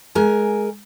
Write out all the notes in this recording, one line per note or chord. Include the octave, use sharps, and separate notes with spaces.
G#3 A#4 G#5